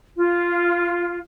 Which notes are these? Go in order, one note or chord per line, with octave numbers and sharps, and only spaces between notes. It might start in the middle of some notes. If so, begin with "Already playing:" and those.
F4